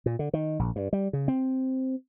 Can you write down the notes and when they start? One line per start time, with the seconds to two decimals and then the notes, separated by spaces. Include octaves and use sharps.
0.06 A#2
0.19 D3
0.33 D#3
0.59 A#1
0.76 G2
0.93 G3
1.13 C#3
1.28 C4